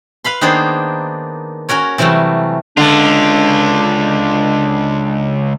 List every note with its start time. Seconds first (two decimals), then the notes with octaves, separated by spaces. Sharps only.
0.24 B4 F5 B5 C6
0.41 D#3 A#3 B3 D4 G#4 C5
1.69 C#4 F#4 A#4 C#5
1.98 C3 E3 F#3 G3 A3
2.77 C#2 D3 D4 F4